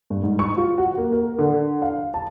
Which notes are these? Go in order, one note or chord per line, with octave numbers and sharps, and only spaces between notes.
G2
G#2
C#6
F4
F#4
A#3
A#4
D3
F5
A5